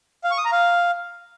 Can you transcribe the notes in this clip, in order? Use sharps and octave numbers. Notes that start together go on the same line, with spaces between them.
F5
C#6
D#6
A#5
F5